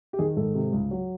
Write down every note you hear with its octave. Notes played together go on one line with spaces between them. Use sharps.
G4
D#3 G#4
G#2 A4
C3
C#2
F#3